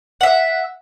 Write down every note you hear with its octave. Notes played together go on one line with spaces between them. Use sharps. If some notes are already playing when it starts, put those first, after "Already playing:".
E5 F#5